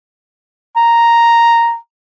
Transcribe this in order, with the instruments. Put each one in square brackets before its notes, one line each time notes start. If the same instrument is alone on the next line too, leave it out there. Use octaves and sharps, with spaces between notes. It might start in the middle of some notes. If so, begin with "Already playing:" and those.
[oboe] A#5